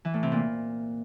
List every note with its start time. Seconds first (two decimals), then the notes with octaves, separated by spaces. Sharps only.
0.05 E3
0.14 A2
0.23 C3
0.32 A#2